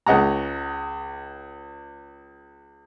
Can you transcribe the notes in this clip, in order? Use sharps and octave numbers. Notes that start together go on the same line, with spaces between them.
C#2 D#5 F#5 A#5